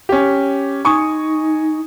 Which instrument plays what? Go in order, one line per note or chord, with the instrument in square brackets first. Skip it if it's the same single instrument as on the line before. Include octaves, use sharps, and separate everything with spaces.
[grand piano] C#4 G4
[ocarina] D#4 [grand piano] G#5 C#6 D#6